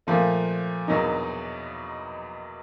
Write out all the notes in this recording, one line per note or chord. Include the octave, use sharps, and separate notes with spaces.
A#2 F3 A3
E2 B2 F#3 A#3 D#4